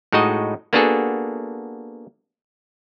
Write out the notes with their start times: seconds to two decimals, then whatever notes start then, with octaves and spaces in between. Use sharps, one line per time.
0.12 A2 G#3 D#4 F#4 D#5
0.73 A#3 B3 D4 F#4 G#4 A4